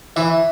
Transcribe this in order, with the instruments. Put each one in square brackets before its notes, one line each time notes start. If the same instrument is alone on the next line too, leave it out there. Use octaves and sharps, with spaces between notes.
[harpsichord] E3 [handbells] E5